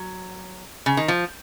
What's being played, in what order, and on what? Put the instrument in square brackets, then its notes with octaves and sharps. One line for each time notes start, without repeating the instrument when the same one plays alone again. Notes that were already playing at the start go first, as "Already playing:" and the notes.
Already playing: [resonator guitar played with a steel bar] F#3
C#3
D#3
F3